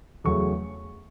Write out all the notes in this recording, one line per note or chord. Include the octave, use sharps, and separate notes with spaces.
E2 C#3 F#3 A3 C#6